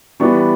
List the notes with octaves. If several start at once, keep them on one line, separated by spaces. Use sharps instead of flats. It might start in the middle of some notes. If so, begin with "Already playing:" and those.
E3 G3 B3 D4 C#6
B5